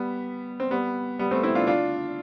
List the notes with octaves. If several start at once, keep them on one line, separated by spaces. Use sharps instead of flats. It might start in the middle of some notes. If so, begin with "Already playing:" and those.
Already playing: G3 B3
C4
G3 B3
G3 B3
A3 C4
C4 E4
D4 F4
D4 F4